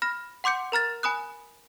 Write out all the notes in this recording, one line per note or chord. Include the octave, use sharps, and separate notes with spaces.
B5 F6 A#6
F#5 C6 D6 G6 C#7
A#4 A#5 F6 A6
G#5 B5 D#6 F#6